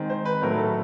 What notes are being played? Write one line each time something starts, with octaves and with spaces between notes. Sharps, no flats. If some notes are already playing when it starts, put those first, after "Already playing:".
Already playing: D#3 G#3 C4
C5
B4
A2 F#3 A3 C4 A#4
A4